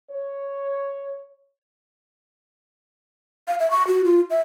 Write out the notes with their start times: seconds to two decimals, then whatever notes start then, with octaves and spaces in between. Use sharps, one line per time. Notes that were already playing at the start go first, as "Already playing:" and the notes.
0.11 C#5
3.48 F5
3.60 E5
3.71 C#6
3.87 F#4
4.05 F4
4.30 E5